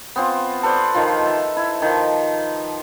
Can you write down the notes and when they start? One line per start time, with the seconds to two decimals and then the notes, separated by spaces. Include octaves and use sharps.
0.16 B3 C4 F4
0.63 A4 B4 C5 D5
0.95 D#3 F3 F4
1.26 E5
1.57 E4
1.82 D#3 F3